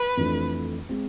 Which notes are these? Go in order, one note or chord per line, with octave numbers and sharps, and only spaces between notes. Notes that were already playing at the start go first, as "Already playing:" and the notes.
Already playing: B4
F2 E3 A3 D4
G#3 C4